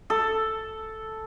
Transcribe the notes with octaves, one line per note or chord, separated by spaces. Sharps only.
A4